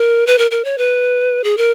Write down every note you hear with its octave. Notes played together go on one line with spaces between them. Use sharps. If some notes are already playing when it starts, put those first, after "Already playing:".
Already playing: A#4
B4
A#4
A#4
C#5
B4
G#4
A#4